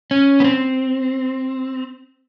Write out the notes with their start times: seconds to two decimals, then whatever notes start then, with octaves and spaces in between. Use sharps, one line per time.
0.11 C#4
0.40 B3
0.44 C4